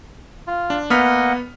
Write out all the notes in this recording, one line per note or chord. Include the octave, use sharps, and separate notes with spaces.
F4
D4
A#3 B3 D#5 F#5 F6 B6